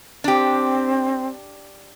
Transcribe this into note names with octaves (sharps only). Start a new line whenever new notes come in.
C4 D4 G4